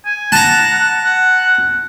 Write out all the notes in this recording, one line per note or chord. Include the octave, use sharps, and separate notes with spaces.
G#5
F#5 A5 A#5
F#5